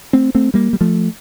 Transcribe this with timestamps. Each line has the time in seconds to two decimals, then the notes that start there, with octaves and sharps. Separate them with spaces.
0.13 A3 C4
0.35 A3 C4
0.54 G3 A#3
0.73 G3
0.81 F3 A3